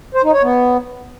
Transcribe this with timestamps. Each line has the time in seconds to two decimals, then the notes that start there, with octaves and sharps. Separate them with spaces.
0.15 C5
0.24 D#4
0.33 C#5
0.42 B3